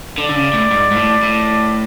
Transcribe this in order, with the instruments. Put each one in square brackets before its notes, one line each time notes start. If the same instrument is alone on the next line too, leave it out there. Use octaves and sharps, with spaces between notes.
[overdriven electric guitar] D3 [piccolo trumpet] D5
[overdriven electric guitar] D3
C#3
A2
G#2
G#2
A2
A2